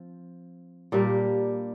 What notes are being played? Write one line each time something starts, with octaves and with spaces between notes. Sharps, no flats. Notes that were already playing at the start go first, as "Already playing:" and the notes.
Already playing: F3 C4
A#2 G3 A#3 D4